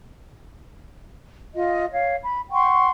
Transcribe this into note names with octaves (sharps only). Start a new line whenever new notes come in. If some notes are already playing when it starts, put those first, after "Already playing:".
F4 D#5
C#5 F5
B5
F#5 G5 C6 C#6